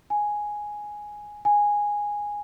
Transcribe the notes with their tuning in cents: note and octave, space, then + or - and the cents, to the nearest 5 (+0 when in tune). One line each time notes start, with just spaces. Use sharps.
G#5 +0
G#5 -10